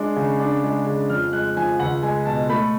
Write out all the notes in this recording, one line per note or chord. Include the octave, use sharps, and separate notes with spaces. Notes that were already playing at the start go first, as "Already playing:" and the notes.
Already playing: G#3 D4
C#3
D4
G#3
C#3
F2 F6
G#3 F#6
F3 G#5
C#2 F#5
G#3 G#5
B2 A5
A3 B5